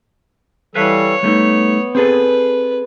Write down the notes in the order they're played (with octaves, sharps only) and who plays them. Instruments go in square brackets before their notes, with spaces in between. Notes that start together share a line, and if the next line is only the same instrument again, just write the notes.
[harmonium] E3 G3 A4 [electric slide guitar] B4 E5 F5 [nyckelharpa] C#5
[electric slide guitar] G3 A3 D#4 [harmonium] B3
[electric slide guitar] C4 G#4 A4 [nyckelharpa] B4